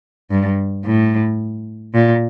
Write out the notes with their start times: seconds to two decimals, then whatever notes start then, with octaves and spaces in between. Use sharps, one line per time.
0.31 G2
0.86 A2
1.94 A#2